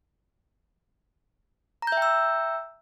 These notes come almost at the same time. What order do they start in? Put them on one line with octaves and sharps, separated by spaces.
A#5 G6 E5 G5 E6